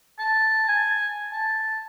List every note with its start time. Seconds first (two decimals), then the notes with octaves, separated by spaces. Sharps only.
0.19 A5
0.68 G#5
1.33 A5